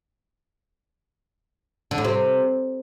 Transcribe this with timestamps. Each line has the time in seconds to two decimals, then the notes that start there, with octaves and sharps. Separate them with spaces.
1.91 D3
1.98 A2
2.04 C3